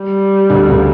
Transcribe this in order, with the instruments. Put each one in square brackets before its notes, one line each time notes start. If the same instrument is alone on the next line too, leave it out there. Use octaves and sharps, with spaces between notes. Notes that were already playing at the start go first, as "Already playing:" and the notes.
Already playing: [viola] G3
[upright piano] D2 D3
C#2 C#3